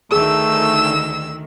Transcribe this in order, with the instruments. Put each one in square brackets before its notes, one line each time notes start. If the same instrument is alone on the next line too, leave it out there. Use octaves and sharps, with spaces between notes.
[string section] D2 D#3 [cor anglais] A3 [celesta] G#4 [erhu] E6